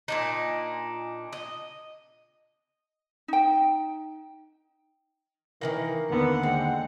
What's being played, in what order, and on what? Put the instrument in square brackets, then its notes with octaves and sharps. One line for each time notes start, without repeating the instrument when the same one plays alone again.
[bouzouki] A#2 D4 D#4
D#5
[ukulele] D#4 G5
[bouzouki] D#3 G#3 A#3 [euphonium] E3
[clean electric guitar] D#2 D3 [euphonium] B3 [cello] F#5
[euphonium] G#3 [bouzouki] C4